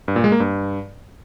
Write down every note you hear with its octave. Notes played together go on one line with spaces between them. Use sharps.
G2
A#2
G#3
A#3
G2